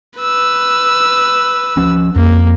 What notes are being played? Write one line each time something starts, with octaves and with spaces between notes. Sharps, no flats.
B4 E6
F3 C#4
F2 A#3